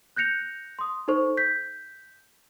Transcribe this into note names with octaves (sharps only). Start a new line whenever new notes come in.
F#6 G6 A#6 C#7 F7
C6 D#6
D#4 A4 C5 C#6
G6 B6